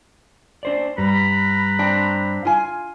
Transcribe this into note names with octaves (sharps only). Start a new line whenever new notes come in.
D4 C5 D5
G2 G3 B4 A#5 B5
C4 D4
F4 G#5